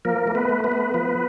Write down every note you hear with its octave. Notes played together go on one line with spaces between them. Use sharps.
F3 A#3 A#4
A3
B3 B4
A3
B3 B4
A3
F3